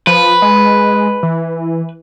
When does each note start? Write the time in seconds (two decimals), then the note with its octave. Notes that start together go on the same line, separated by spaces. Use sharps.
0.07 F3 B4
0.42 G#3
1.23 E3